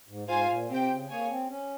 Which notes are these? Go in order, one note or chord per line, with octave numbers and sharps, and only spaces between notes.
G#2
G#2 F4 C5 F5 G#5
A#2
C3 C4 G4 C5 G5
C#3
A#3 G#4 C#5 G#5
C4
C#4